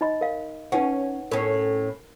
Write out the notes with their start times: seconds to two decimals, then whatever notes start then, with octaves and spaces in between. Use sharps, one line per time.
0.01 D#4 D#5 B5
0.21 A#4 F5
0.72 C#4 D#4 B4 F#5
1.31 A2 C#4 A#4